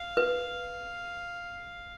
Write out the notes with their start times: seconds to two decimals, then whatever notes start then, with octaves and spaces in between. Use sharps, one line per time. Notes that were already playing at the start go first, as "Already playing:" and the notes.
Already playing: F5
0.17 B4